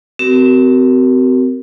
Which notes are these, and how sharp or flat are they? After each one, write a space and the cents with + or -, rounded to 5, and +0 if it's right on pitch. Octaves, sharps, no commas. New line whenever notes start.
C4 -35 F#4 +40 A#4 +0